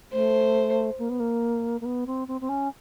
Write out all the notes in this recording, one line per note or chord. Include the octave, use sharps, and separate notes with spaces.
A3 C5
A#3
B3
A#3
A#3
B3
C4
C4
C4
C#4